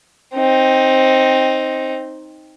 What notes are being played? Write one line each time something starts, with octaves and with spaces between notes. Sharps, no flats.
C4 D#4